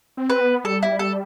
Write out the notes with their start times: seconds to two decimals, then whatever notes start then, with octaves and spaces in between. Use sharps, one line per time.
0.17 C4
0.30 B4
0.41 B3
0.64 G3 A4
0.83 E4
0.99 A4